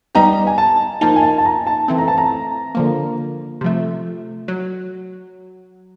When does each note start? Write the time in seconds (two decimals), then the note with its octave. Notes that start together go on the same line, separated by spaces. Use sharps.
0.15 G3 B3 D#4 G4 A#5
0.47 G#5
0.58 A5
1.01 F3 A#3 D#4 A5
1.16 G#5
1.22 A5
1.38 A5
1.45 A#5
1.67 A5
1.88 E3 A3 C4
1.98 A#5
2.08 A5
2.18 A#5
2.75 D3 F3 A#3
3.61 C3 F3 A3
4.48 F#3